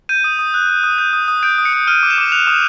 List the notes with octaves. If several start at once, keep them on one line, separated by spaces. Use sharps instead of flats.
G6 D#7
D#6
D#6
F#6
D#6
D#6
G6
D#6
D#6
G6 D7
D#6
C#7
D#6
F6 D#7
D6
E7
D6
F#6 F7
D#6